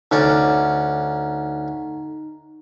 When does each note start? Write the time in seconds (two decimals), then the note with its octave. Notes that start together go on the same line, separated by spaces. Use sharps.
0.11 D2 C#4 D#4 D5